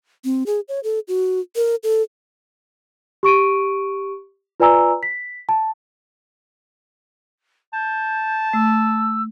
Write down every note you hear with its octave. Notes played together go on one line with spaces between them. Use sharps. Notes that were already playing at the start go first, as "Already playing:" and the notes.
C4
G#4
C#5
A4
F#4
A#4
A4
G4 C#6 D7 D#7
F4 B4 D5 G#5 A#5 E6
B6
A5
A5 G6
A3 E6